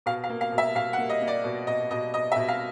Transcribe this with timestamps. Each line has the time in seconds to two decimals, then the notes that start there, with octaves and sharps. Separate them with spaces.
0.06 B2 F5
0.24 F5
0.29 A#3
0.41 F5
0.52 B2
0.58 E5
0.75 B2 F5
0.93 F#5
0.98 A#3
1.09 D#5
1.22 A#3
1.27 D5
1.44 B2
1.67 B2 D#5
1.91 B2 D#5
2.14 B2 D#5
2.32 E5
2.36 B2
2.48 F5